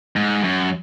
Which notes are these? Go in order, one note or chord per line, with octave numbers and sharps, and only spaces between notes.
G#2
F#2